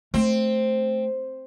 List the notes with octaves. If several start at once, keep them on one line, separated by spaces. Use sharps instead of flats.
A3 C4